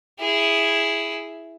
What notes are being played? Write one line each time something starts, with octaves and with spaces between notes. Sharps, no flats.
E4 G#4